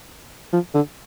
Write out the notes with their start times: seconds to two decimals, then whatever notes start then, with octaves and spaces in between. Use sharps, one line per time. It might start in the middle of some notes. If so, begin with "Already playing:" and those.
0.53 F3
0.74 D3